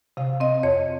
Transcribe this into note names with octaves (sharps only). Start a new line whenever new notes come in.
C3 F5
C4 D#5
F2 C#5